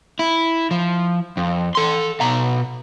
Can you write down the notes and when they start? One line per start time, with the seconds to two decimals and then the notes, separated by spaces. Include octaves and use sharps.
0.19 E4
0.71 F3
1.37 F2
1.75 A4 C6
2.21 B2 A#5